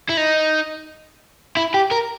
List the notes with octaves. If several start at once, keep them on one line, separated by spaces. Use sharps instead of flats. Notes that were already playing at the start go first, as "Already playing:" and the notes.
E4
D#4
E4
G4
A#4